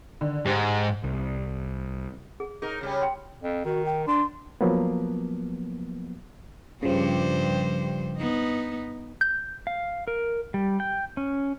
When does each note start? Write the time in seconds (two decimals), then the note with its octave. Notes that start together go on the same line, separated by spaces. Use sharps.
0.21 D3 D#3
0.45 G#2 G4 C5
1.04 C2
2.40 G#4
2.62 D#4 G#4 A#4
2.81 C#3 G3 C#4
3.02 G5 C6
3.42 F2
3.65 D#3 F#4
3.86 G5
4.07 D4 C6
4.61 F3 F#3 A#3 B3
6.83 G2 C#3 F3 G3 C5
8.18 B3 D#4
9.21 G6
9.67 F5
10.08 A#4
10.54 G3
10.80 G5
11.17 C#4